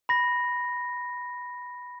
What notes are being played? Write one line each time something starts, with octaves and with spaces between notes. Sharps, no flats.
B5 A#6